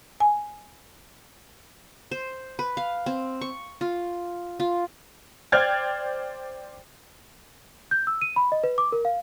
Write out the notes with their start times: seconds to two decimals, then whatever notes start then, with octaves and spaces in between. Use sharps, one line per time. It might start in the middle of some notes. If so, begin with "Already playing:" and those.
0.20 G#5
2.11 C5
2.59 B4
2.77 F5
3.06 C4
3.41 C#6
3.81 F4
4.60 F4
5.52 C5 D5 G5 F6 G#6 A6
7.91 G6
8.07 E6
8.22 D#7
8.36 B5
8.52 D#5
8.64 B4
8.78 D6
8.92 A#4
9.05 F5